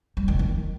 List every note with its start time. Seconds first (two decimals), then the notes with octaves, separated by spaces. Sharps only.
0.17 G3
0.28 D#3
0.39 D#3